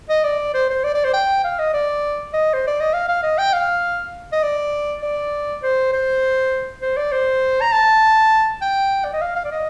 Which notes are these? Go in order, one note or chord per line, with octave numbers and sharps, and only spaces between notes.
D#5
D5
C5
C5
D5
D5
C5
G5
F5
D#5
D5
D#5
C5
D5
D#5
F5
F5
D#5
G5
F5
D#5
D5
D5
C5
C5
C5
D5
C5
A#5
A5
G5
D5
D#5
F5
F5
D5
D#5